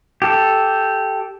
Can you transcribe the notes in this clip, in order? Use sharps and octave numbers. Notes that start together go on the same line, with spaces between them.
G4 A4